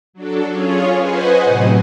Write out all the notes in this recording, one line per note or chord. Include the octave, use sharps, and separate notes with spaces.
F#3 D4 A4
C#4 F4 G#4 C#5
B4 C5 D#5 F#5 G#5
A2 C3 F#3